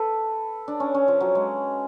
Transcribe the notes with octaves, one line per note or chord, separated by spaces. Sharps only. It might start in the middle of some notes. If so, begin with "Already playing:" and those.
Already playing: A4 B4
D4
C#4
C#4
F3
F#3
G#3